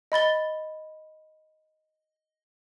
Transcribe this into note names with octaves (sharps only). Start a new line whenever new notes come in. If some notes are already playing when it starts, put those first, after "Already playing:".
D#5 B5 A6 G7